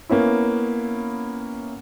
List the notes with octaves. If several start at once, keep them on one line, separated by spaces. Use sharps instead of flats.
A#3 B3 C#4 E4